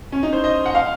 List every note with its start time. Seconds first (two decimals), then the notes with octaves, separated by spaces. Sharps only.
0.12 C#4
0.23 D#4
0.33 C5
0.44 D#5
0.66 F#5
0.75 F5